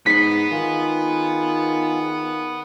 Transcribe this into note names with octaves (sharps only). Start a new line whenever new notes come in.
G#2 B3 B6 C7
D#3 F4 G#4